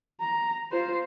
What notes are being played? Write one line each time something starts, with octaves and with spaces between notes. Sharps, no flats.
A#5
F4 C5